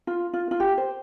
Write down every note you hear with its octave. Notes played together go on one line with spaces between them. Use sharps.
F4
F4
F4
G4
C5